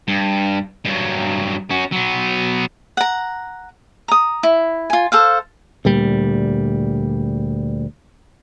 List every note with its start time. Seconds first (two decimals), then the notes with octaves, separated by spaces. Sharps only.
0.08 G2
0.85 G2 F#3
1.70 C#4 F#4
1.92 F#3 B3
2.97 F#5 A#5
4.08 A#5 D#6
4.43 E4
4.90 F4 G#5
5.12 A4 C5 F5
5.85 D2 A#2 G3